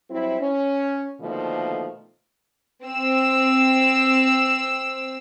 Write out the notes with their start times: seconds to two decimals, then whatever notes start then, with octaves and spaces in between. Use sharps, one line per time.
0.10 F#3 G3 C4 E4
0.40 C#4
1.20 B2 D3 D#3 F3 A3 A#3
2.84 C4 E6